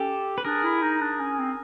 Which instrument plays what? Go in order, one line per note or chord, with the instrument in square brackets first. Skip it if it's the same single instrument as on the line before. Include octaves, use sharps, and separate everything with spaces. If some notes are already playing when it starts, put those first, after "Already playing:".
Already playing: [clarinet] C#4 [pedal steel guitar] G4 A4
[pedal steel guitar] B4
[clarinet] D4 [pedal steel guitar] G#4 A#4
[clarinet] E4
D#4
D4
C#4
C4